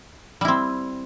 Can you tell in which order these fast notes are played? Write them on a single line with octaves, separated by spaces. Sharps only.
G3 E4 C4